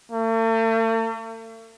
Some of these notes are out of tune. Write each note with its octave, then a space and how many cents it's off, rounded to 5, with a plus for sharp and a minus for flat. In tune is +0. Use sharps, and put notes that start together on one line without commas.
A3 +45